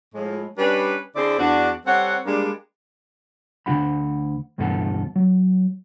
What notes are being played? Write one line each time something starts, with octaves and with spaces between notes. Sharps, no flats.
A2 F3 G#3
G3 C#4 D4 B4
D3 C4 E4 G#4 C5 D5
E2 D4 F#4
G3 C4 A4 C#5 F#5
G3 G#3 A#3 D4
D2 D3 D#3 F4 F#5 B5
D2 G2 B2 E3 A4 F#5
F#3